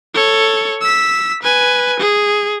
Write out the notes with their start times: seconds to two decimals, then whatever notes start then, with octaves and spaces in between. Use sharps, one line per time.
0.14 A4 C#5
0.82 E6 B6
1.43 B4 G#5
2.00 G#4